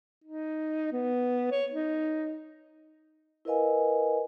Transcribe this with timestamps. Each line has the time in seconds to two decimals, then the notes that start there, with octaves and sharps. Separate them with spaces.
0.24 D#4
0.92 B3
1.51 C#5
1.72 D#4
3.45 E4 A#4 B4 D#5 F5 G#5